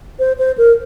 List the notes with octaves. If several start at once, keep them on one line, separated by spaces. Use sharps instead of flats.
C5
C5
A#4